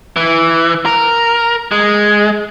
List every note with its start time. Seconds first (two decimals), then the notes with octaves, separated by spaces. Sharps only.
0.16 E3
0.86 A#4
1.72 G#3